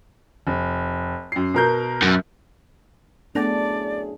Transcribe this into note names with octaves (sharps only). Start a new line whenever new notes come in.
F1
F#2 C7
B2 A#4 G6
F#2
F#2 A2 A3 B3 D4 G#4 A4 D5